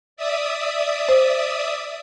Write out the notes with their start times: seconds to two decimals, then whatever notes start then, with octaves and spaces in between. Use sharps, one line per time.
0.17 D5 E5 D#6
1.09 C5